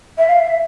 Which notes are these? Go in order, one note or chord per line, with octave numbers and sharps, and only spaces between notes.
E5
F5
E5